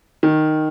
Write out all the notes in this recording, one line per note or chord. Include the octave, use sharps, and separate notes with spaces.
D#3